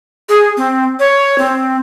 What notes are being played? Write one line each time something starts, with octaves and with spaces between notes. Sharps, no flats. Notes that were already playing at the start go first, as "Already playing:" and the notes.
G#4
C4
C#5
C4